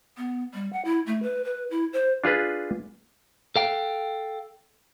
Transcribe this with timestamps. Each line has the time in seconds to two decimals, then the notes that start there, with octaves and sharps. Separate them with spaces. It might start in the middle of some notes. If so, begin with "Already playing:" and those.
0.17 B3
0.54 G3
0.73 F#5
0.85 E4
1.06 A3
1.22 B4
1.44 B4
1.71 E4
1.93 C5
2.24 D4 F4 G#4 B4
3.56 A4 F5 G5